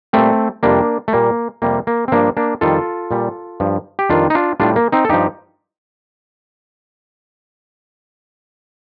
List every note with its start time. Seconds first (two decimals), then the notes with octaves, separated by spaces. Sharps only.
0.13 A#2 G3 A3 C4
0.63 F2 C3 G3 A#3 D4
1.08 A3
1.13 A#2 G3 A#3
1.62 F2 C3 G3 A#3
1.87 A#3
2.08 C4
2.12 G2 F3 A#3 D4
2.37 A#3 D4
2.61 F2 D#3 G3 F4 A4
3.11 A#2 G3
3.60 G2 F3
3.99 G4
4.10 F2 D#3 G3 D4 F4
4.30 D#4
4.35 D4 F4
4.60 A2 G3 D4 F4
4.76 A#3
4.92 C4 D#4
5.05 A4
5.09 G2 F3 D#4 G4